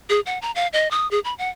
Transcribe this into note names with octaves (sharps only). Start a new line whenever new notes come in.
G#4
F#5
A#5
F5
D#5
D#6
G#4
B5
F#5